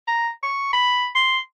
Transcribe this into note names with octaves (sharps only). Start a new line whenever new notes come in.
A#5
C#6
B5
C6